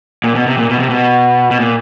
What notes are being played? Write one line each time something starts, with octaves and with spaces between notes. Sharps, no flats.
A#2
B2
C3
A#2
B2
C3
B2
B2
A#2